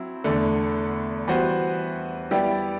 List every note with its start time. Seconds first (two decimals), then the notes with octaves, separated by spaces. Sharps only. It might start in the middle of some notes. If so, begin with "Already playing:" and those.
Already playing: F#3 C4 E4
0.24 E2 D3 A3
1.28 E3 G3 B3 F#4 C5
2.31 G3 B3 E4 G4 D5